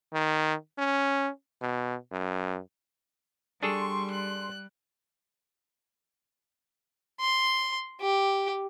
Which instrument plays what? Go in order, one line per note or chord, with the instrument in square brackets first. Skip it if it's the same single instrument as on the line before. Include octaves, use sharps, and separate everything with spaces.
[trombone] D#3
C#4
B2
F#2
[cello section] G3 [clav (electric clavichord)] D4 G#4 A4 [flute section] C6 [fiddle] C#6
[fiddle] F#6
[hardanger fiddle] C6
G4